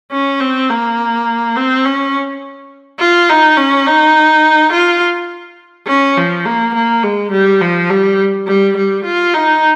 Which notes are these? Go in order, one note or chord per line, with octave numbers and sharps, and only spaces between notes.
C#4
C4
A#3
C4
C#4
F4
D#4
C#4
D#4
F4
C#4
F3
A#3
A#3
G#3
G3
F3
G3
G3
G3
F4
D#4